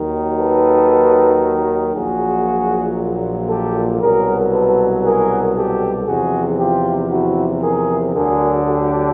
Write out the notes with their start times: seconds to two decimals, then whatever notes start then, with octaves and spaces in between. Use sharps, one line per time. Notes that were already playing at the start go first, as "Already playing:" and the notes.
Already playing: D#2 D#3 F#3
0.38 A4 B4
1.93 A#1 A#2 F#3 F#4 G#4
3.49 G4 A4
4.01 C2 B2 F#3 G#4 A#4
4.52 A4 B4
5.04 G#4 A#4
5.57 G4 A4
6.08 E2 C3 F3 F#4 G#4
6.60 F4 G4
7.11 E4 F#4
7.63 G#4 A#4
8.15 D2 D3 F#3 G#4 A#4
8.66 G4 A4